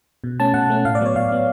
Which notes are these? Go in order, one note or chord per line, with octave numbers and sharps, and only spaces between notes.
B2
A3 C#4 A5
B2 F#5
A3 C#4
A2 F5
D5
F#3 B3 C#5
A2 F5
F#3 B3